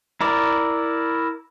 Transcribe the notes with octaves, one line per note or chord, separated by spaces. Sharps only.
E4 A#4 D5